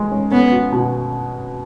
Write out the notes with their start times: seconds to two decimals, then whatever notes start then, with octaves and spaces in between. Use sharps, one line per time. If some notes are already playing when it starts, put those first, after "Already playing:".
Already playing: G#3
0.11 C#4
0.31 B3 C#4
0.52 F#4
0.72 B2